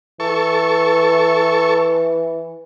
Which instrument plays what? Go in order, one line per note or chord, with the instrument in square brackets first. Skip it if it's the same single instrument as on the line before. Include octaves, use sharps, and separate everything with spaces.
[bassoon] E3 [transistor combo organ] A4 C#6